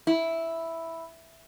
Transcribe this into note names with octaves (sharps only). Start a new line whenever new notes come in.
E4